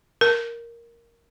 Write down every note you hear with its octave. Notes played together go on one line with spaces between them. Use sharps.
A#4